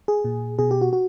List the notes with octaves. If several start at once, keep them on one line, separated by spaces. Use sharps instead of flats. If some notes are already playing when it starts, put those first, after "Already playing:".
G#4
A#2
B2 G#4
G4
F#4
F#4